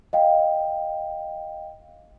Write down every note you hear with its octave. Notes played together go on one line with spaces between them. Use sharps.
D#5 F5 G5